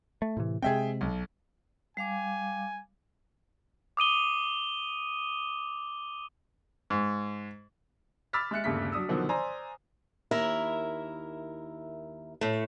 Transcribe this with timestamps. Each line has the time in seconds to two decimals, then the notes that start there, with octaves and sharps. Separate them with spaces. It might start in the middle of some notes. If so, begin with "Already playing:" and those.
0.22 A3
0.37 A2 C3 E3
0.62 C3 G#3 C4 G#4 E5 G5
1.01 B1
1.97 G3 F5 G#5 D6
3.97 D6 D#6 D#7 G7
6.90 G#2
8.33 B5 D6 E6 F6 A6 B6
8.51 G#3 E5 F#6 C#7
8.64 G1 D#2 C#3 A3 B6
8.92 F#3 D4 D#6 E6
9.09 B2 D3 D#3 F3 F#3
9.29 C5 D5 G#5 A#5 C6
10.31 D#2 E4 A#4 E5
12.41 A2 A3